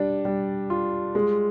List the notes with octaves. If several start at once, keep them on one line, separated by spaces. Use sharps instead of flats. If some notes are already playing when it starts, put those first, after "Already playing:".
Already playing: G3 D4
G3
F4
G#3